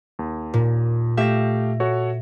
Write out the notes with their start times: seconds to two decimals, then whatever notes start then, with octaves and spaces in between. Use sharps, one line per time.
0.19 D#2
0.54 A#2
1.17 A3 G4 E5 F5 A#6
1.80 F#4 A4 C#5